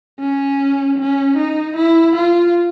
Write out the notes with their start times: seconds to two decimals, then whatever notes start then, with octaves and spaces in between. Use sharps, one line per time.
0.20 C#4
0.98 C#4
1.37 D#4
1.76 E4
2.16 F4